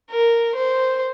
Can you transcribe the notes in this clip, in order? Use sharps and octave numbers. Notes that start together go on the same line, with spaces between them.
A#4
C5